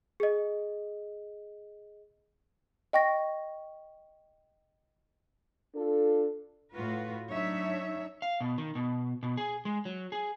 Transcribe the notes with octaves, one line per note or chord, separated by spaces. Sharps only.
G#4 D#5
D#5 G5 C#6 A#6
D4 F4 A4
A2 F4 F#4 B4
F#3 D4 D#4 C#5 E5
F5
B2
D#3
B2
B2
G#4
G#3
F#3
G#4